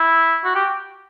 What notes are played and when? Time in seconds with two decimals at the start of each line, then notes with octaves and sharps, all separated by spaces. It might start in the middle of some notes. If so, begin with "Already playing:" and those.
Already playing: E4
0.45 F#4
0.55 G4